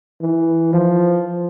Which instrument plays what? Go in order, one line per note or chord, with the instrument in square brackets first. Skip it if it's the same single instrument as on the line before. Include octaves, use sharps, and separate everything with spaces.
[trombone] E3
F3